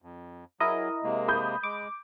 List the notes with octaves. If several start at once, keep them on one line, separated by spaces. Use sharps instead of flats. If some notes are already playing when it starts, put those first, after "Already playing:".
F2
F#3 E4 G#4 A#4 D#5
C3 G#3 A#3
B5 D#6 G6
G#3 D6